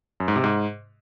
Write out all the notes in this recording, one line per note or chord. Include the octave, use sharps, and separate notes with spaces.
F#2
G#2
C3
G#2